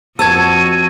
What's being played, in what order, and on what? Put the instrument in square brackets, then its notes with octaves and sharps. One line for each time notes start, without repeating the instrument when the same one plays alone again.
[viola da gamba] F2 F#4 [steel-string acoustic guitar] C#5 A5 [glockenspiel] E6 G#6 [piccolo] D#7